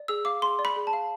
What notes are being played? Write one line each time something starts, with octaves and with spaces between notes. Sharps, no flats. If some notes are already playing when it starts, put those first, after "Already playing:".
Already playing: D5
G#4 E6
F5 D6
G#4 C6
D5
B5
G#4
A5
F5